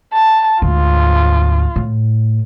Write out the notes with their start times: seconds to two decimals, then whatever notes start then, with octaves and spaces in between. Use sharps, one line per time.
0.13 A5
0.62 D2 G#2 F4
1.76 A2